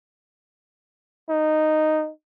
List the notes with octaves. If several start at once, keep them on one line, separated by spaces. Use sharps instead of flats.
D#4